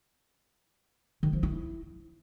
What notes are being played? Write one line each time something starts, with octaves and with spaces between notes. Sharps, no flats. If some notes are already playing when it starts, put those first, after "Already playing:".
D#3
F3
E4